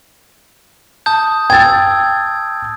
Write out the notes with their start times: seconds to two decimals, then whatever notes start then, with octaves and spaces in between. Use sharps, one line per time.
1.06 A5 D#6 G6
1.50 G5 E6 G#6 A6